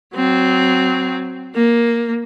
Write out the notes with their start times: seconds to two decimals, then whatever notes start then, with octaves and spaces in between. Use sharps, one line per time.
0.14 F#3 C4
1.55 A#3